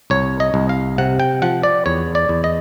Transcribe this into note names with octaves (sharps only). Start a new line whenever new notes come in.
C2 C#5
D#5
C2
F5
C3 F#5
G5
F3 F#5
D5
E2 C#5
D5
E2
D#5